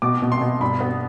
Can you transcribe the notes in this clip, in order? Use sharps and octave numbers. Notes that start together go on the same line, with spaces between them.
B2 D6
B2
C6
B2
G2 B5
B3